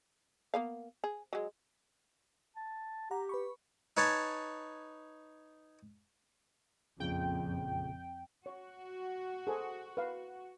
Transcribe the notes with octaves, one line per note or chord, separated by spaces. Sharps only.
A#3 B3 F5
G#4
F#3 G#3
A5
G4 F#5 A#5
B4 B5 C#6
D#4 B4 C#5 G#5 A5
A#1 F2 A#2 C#3 G5
F#4 C#5
G#4 A4 C5
B4 F5